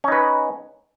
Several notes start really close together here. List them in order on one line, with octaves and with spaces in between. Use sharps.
C#4 D#4 B4